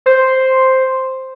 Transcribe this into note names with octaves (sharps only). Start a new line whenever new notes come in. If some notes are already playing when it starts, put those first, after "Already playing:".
C5